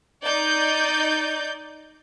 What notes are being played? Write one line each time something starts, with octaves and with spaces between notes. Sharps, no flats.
D#4 D5 G6